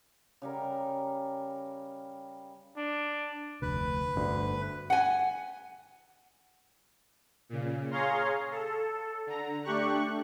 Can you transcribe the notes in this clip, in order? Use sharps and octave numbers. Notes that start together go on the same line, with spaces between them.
C#3 G3 A#4
D4
F1 D2 B4
G1 D2 G2 D4
F#5 G#5
A#2 C#3
G#4 C#5 F5 A#5 C6
A4
D3 A#5
A3 D4 G4 C#6 F#6